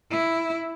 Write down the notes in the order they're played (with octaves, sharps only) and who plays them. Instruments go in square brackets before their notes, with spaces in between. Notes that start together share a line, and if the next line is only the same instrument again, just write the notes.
[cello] E4